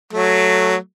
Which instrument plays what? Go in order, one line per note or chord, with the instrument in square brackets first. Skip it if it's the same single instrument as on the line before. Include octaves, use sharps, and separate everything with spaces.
[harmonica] F#3 A3